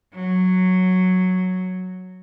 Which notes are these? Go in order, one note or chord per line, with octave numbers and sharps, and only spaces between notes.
F#3